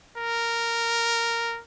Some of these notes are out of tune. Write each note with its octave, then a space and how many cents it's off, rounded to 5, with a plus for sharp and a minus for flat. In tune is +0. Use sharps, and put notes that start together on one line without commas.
A#4 -5